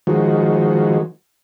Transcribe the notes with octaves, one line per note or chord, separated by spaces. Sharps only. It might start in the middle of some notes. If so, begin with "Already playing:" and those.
D#3 F3 G#3 F#4